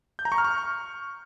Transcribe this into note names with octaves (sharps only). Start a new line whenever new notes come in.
G6
A#5
C#6
F6
C#6